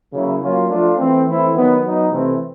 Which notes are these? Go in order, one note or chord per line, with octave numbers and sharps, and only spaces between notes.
C#3 F#3 A#3 C#4 E4
F#3 A#3 C#4 F4
F3 A3 D4 F4
E3 A3 C4
E3 A3 C4 E4
D#3 F#3 B3 D#4
F#3 B3 D#4
C3 E3 A3 C4